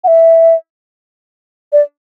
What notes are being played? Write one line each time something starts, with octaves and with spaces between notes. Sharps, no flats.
F#5
E5
D5